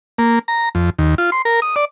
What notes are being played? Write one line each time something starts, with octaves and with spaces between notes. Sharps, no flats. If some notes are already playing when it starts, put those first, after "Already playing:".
A#3
A#5
F2
D#2
F4
C6
A#4
D#6
D5